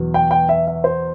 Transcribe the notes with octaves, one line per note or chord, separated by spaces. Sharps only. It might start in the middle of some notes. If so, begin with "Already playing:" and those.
Already playing: E2 B2 F#3
G5
G5
E5
E5
C5